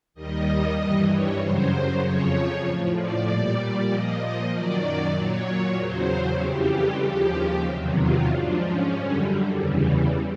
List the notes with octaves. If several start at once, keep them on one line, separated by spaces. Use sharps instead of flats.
D#2 D#3 G3 D#5
G2 E3 G3
C#5
F#2 C#3 F#3 C5
F2 C#3 F3 C#5
A2 F3
D5
A#2 G3
D5
A#2 F3 D#5
F#2 D#3 F#3 D5
A#2 F#3 C#5
E2 C#3 F#3 C5
F2 C#3 E3 G3 G4
D#2 C#3 F3 G4
E2 C3 D#3 F#3
F4
G#2 F3 D4
C#4
F#2 D3 G3
E2 C#3 E3 G3